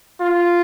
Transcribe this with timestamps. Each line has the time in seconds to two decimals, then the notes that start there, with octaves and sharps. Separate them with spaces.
0.21 F4